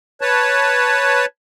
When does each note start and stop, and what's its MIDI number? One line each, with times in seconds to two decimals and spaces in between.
0.21 1.25 71
0.21 1.25 73
0.21 1.25 81